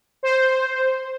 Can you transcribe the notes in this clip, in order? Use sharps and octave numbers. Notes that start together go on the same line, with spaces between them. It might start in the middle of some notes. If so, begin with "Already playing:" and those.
C5